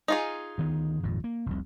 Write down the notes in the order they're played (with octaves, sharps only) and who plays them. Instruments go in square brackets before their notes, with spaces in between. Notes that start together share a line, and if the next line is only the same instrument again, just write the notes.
[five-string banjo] D#4 F4 G#4
[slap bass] D2 D#3 B3
G#1 F2 A#2
A#3
F1 C2